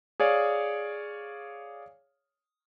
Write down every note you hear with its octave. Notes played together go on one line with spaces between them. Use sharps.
G#4 C#5 D5 F5